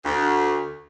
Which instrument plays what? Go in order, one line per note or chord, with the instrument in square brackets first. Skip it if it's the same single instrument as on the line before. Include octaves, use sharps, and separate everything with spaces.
[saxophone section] D2